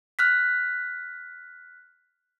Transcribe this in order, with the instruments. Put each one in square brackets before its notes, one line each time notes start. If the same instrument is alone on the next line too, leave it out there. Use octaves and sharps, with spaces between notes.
[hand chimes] F6 F#6 B6